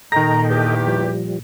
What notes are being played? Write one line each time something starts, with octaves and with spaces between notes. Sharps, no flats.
A#2 D#3 A4 D#5 G5 A#5 A#6
E2 G4
F3 G3